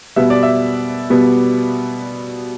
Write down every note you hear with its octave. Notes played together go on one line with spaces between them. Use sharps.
B2 G3 B3 E5
D5
E5
B2 G3 B3